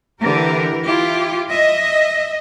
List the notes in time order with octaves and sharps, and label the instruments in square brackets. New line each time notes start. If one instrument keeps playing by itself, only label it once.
[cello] D3 [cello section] E3 G4 A#4
[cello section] E4 [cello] F4 G4
[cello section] D#5 [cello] E5